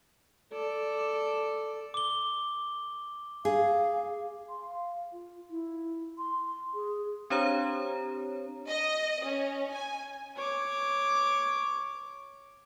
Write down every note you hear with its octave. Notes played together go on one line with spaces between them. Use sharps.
A4 D5
D6 G7
G#4 F5
C6
F5
F4
E4
C6
G#4
C4 D4 G4 C5 C#5 A#5
D#5
C#4
G#5
C#5 D6